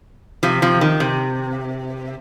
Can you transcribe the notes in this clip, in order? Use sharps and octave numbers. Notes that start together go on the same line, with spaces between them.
C3 F3
C3 F3
D#3
C3